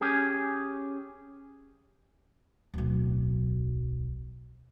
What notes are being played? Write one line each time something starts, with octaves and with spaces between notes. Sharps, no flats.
C#4 G4 G#4
D1 B1